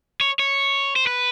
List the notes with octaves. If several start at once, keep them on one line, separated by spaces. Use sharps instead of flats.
C#5
C#5
C5
B4